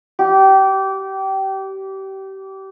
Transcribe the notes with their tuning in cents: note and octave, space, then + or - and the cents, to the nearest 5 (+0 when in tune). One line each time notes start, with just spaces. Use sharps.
G4 -25